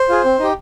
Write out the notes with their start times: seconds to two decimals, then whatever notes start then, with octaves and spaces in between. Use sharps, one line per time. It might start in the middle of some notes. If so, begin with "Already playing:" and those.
Already playing: C5
0.09 F4 G#4
0.24 C4
0.39 D#4 G4